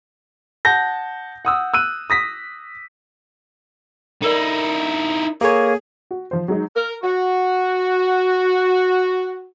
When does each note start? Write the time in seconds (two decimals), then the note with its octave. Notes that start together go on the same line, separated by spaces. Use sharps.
0.65 F#5 A5 G6 A#6
1.45 F#5 D#6 E6
1.74 E6 F#6 D#7
2.10 D#6 A#6 B6
4.22 D#4 E4 A4 A#4 D5
5.41 A#3 G#4 A4 C#5
6.11 F#4
6.31 F3 C5
6.48 F#3 G#3 D#4
6.76 A#4
7.03 F#4